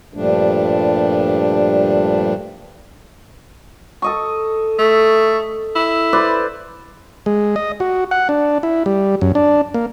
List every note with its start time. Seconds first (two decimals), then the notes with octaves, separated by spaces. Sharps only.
0.14 G2 A#2 F3 G3 A3 D4
4.02 A4 D#5 C#6
4.79 A3
5.76 E4
6.13 B4 C5 D5
7.26 G#3
7.56 D#5
7.80 F#4
8.11 F#5
8.29 D4
8.63 E4
8.86 G3
9.21 F#2
9.35 D4
9.74 A#3